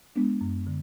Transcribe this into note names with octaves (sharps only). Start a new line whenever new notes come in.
G#3 B3 D4
F#2
D3